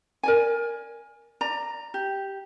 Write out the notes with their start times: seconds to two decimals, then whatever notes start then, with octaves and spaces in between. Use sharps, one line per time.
0.23 A#4 D5 G#5
1.41 D5 A#5
1.94 G4